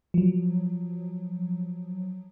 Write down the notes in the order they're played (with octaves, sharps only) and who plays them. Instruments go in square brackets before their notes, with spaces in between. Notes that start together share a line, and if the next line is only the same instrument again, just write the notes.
[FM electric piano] F3 F#3